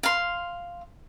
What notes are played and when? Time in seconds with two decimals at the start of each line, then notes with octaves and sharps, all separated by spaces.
0.03 F5 C6